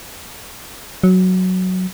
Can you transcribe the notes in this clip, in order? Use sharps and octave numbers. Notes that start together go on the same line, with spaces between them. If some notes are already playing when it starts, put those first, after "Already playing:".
F#3